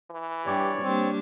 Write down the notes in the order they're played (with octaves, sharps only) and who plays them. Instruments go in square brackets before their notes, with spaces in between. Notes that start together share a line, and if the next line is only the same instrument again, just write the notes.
[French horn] E3
[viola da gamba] G2 [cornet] G4 [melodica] C#5 D5
[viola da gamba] G3 A#3 D4 [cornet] C4